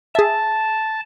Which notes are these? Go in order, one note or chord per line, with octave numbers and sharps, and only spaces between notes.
G#4 E5 A5